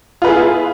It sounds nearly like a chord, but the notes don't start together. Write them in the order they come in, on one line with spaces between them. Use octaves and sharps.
F4 B4 G#4 E4